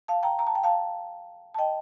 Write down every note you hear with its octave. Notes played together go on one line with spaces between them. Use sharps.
F5 A5
G5 A#5
A#5
A5
G5
F5 A5
A5
D#5 G5